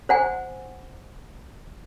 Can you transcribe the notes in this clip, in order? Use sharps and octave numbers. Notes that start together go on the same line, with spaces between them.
C5 F#5 G#5